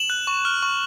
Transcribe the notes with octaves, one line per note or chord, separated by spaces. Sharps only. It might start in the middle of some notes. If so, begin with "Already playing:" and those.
Already playing: E7 F#7
F#6
C#6
F6
C#6